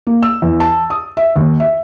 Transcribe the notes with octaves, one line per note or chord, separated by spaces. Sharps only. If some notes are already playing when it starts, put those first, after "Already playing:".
A#3
E6
E2
A5
D#6
E5
D#2
E5